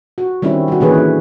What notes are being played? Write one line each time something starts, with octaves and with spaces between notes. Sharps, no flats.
F#4
D#3 G3 C4 C#4 E4
G3 F#4
A#2 D3 E3 C#4 G#4 B4
E4